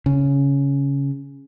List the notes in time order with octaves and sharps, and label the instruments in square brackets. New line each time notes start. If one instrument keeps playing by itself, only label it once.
[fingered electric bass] C#3